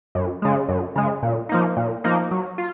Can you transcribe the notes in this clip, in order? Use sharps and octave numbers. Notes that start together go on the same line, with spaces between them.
F#2
C#3 G#3
F#2
C#3 G#3
A#2
F3 A#3 D#4
A#2
F3 A#3 D#4
F#3
F4